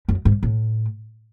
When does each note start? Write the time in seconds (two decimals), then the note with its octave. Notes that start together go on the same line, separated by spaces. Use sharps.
0.08 F#2
0.25 G#2
0.43 A2